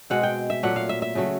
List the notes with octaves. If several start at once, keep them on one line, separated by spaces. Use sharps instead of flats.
B2 G#3 C4 F#5
G5
E5
A#2 F#3 A3 F#5
F5
E5
E5
C#3 F#3 A3